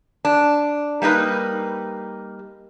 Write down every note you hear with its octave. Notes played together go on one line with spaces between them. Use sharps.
D4
G3 A#3 D#4 B4